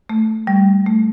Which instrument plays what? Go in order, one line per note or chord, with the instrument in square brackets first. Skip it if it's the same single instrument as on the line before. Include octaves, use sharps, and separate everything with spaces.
[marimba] A3
G3
A3